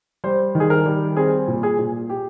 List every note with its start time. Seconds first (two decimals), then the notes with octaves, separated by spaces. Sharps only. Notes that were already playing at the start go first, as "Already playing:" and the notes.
0.24 G3 C5
0.55 D#3
0.60 G#4
0.70 A#4
0.86 G3
1.17 C4 G#4
1.48 A#2
1.63 G#4
1.79 A#2
2.10 G4